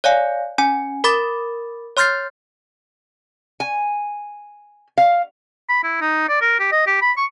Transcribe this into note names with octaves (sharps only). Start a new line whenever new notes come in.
C#5 D5 F5 G#5
C#4 G#5
A#4 B5 D6 A6
C#5 C6 F6 G6 A6 C7
G#5
F5
B5
E4
D#4
D5
A#4
G4
D#5
G4
B5
C#6